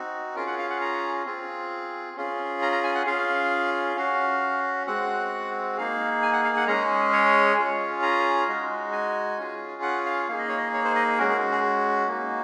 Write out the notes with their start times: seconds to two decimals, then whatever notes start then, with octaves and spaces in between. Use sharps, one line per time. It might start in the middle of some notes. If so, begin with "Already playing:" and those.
Already playing: C4 D#4 F#4
0.35 C#4 F4 G#4 A#4
0.47 F#5
0.59 F5
0.70 F#5
0.81 A#5
1.26 C4 F4 G#4
2.17 C#4 F4 G#4
2.62 A#5
2.72 A#5
2.84 G#5
2.95 F#5
3.06 C#4 F4 G#4 F5
3.96 C#4 F#4 F5
4.87 G#3 C4 F#4 F#5
5.77 A#3 D#4 G#4 F5
6.23 G#5
6.33 F#5
6.44 F5
6.57 F#5
6.67 G#3 C#4 G#4 A#5
7.13 C#5
7.57 C#4 F4 G#4
8.02 A#5
8.48 G#3 D#4 F#4
8.92 G#5
9.38 C#4 F4 G#4
9.82 F#5
10.06 F5
10.29 A#3 D#4 G#4 F5
10.38 D#5
10.49 C#5
10.58 D#5
10.74 C#5
10.85 C5
10.95 D#5
11.18 G#3 C#4 F#4 A#4
11.29 G#4
11.52 G#4
12.08 A#3 D#4 F#4